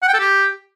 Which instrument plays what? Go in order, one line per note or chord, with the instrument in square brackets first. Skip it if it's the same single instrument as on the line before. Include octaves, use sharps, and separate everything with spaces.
[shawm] F#5
G5
A4
G4